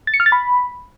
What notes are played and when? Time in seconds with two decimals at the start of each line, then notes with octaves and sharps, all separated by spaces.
0.07 A6
0.14 C#7
0.20 F6
0.26 A6
0.32 B5